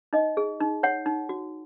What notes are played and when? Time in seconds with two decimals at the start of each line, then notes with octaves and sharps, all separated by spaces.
0.13 D#4 D#5
0.37 G#4
0.60 D#4
0.83 C#5 F#5
1.06 D#4
1.29 F#4